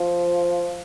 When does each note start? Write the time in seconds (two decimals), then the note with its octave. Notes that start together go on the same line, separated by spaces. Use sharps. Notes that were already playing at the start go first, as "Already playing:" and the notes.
Already playing: F3